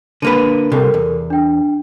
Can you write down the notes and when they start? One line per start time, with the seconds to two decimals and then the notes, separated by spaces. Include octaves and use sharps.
0.22 D3 A#3 B4 D#7
0.72 C2 C3 A4 A#4
0.94 E2
1.30 D4 G5